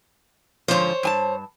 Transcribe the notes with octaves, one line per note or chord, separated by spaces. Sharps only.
G#2 D3 F3 C5 C#5
G2 G#5 A5